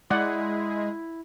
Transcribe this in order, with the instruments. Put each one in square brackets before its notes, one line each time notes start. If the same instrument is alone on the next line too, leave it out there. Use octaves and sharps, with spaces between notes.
[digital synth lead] G#3 [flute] E4 [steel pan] D5 F#5